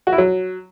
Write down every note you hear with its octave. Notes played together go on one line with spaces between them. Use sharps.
F#4
E4
F#3